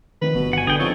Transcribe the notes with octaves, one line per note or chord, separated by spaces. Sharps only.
F1 D#3 B4
G1 B2
F#5 G#5
D3 G#4 G5
F2 D#4 G#4 A4 C#5